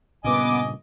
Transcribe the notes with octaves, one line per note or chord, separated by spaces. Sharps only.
G2 A#2 C#3 B3 D#5 G#5 D6